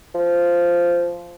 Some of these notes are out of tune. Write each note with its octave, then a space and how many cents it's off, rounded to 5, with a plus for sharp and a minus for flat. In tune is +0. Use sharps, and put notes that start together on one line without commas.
F3 -10